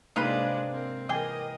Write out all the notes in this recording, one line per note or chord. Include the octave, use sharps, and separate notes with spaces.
G#2 C3 G#3 A#3 D4 D#4 F4 B4
C4 A#4
E3 G4 G#4 A#4 D#5 G5